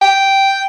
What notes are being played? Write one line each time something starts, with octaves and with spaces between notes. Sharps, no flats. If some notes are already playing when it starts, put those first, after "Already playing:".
G5